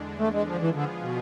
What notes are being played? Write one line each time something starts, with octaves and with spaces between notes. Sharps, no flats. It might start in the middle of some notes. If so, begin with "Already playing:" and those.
Already playing: E2 D3 G#3 D4
A3
G#3
F3
E3 F3 B3 F4 G#4
D3
B2